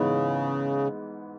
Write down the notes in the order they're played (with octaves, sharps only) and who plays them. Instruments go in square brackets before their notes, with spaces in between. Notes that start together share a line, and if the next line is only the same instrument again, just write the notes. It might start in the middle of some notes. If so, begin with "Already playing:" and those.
Already playing: [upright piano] G#2 E3 B3 D#4 [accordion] C#3